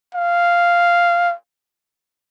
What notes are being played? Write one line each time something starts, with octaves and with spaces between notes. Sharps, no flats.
F5